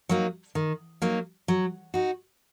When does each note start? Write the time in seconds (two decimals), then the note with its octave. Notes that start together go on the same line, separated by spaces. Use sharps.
0.09 F#3 A#3 D#4
0.55 D#3
1.02 F#3 A#3 D#4
1.48 F#3
1.94 D#4 F#4